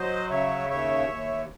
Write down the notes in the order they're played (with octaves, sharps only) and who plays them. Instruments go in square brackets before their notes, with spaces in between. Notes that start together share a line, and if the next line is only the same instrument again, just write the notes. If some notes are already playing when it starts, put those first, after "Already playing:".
Already playing: [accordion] F#3 C5 D#5
C#3 C#5 E5
D#2 C#5 E5
D#2